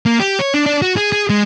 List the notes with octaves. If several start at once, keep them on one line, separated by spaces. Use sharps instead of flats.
A#3
G4
C#5
D4
D4
F#4
G#4
G#4
G#3